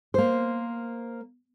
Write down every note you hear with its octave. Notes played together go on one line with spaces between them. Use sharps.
A#3 C5